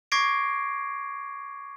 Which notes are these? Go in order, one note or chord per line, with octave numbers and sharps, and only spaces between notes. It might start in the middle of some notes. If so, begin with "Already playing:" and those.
C#6 D6 G#6 A#6 C7 D7